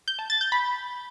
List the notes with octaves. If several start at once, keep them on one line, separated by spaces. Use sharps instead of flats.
G6
A5
A6
G6
B5